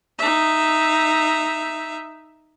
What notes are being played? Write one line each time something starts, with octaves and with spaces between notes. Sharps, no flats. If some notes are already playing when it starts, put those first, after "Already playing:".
D#4 E5